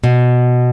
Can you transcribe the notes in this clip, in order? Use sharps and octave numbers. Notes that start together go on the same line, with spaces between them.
B2